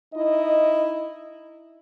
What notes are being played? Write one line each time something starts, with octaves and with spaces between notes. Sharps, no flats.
D#4 E4 D#5